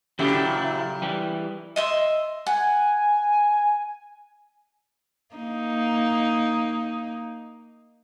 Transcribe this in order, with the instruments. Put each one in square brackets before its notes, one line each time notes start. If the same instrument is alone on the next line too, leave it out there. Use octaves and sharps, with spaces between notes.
[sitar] A#2 C#3 G4 [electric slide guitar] F#3 E4
[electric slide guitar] E3 G3
[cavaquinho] D#5 E5 C6
[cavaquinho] F#5 [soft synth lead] G#5
[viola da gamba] A#3 D#4